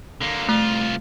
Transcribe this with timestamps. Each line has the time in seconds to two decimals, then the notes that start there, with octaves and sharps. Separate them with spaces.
0.21 D3 A#3
0.49 C2 A3 F4